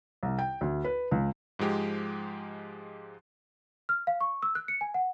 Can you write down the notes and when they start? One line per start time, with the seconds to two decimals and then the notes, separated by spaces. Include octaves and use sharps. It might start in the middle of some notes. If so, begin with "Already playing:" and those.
0.23 C2
0.39 G5
0.61 D2
0.84 B4
1.11 C#2
1.59 G#2 F3 G#3 G4
3.89 F6
4.07 F5
4.21 C#6
4.43 E6
4.55 F#6
4.68 C#7
4.81 G#5
4.94 F#5